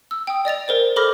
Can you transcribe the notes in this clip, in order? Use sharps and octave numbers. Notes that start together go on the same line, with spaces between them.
E6
G5 D#6
D5 D#5 A6 F7
A#4 C5 D5
A4 C5 B5 D6 F6 A#6